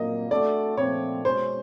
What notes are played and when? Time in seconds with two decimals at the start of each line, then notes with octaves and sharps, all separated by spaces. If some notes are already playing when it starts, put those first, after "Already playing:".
Already playing: A#2 F#3 A#3 D#5
0.31 A3 D4 F#4 A4 D5
0.77 A#2 F3 A3 C4 C#5
1.25 B2 G#3 C#4 C5